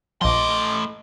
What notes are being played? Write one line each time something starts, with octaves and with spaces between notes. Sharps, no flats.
A#1 A2 F3 D#5 C6 D6